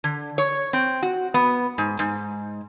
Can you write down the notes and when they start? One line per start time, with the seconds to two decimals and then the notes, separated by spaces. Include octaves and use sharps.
0.04 D3
0.38 C#5
0.73 C4
1.02 F#4
1.34 B3
1.78 G#2
1.99 G#2